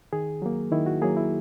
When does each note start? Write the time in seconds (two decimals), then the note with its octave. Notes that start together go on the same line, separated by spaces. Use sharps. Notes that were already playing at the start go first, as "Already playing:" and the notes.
0.13 D#3 G#4
0.42 F#3 A#3
0.72 D#3 E4
0.86 F#4
1.01 F#3 A#3 G#4
1.17 E4